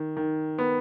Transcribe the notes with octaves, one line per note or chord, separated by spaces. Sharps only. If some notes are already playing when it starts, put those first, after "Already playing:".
Already playing: D#3
D#3
B3